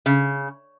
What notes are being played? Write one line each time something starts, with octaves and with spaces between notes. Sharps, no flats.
C#3